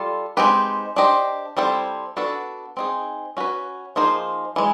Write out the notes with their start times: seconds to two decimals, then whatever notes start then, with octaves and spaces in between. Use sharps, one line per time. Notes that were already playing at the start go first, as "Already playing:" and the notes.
Already playing: G3 F4 A4
0.37 G#3 C4 D#4 G4 B4
0.96 D4 G4 C5 D#5
1.57 G3 C4 E4 A4 C5
2.17 B3 D4 F#4 A4
2.77 C4 D#4 G#4
3.37 C#4 F#4 B4
3.96 F3 A#3 D#4 G#4 C5
4.56 E3 G#3